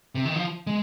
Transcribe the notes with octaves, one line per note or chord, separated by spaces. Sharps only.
C3
D#3
F3
G#3